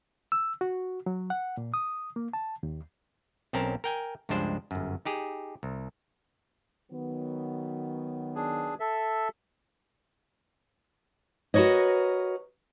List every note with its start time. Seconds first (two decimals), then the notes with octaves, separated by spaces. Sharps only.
0.32 E6
0.61 F#4
1.06 F#3
1.30 F#5
1.57 A#2
1.74 D#6
2.16 A#3
2.33 A5
2.63 D#2
3.53 B1 C4 C#4 A#4 A5
3.84 A#4 G5 G#5
4.29 C#2 G2 F3 G#3 D4 C5
4.71 G1 F#2
5.05 D#4 G4 G#4
5.63 C2
6.92 D#3 F#3 B3
8.35 D4 G#4
8.80 A4 E5
11.54 F#4 A#4 B4 C#5 D#5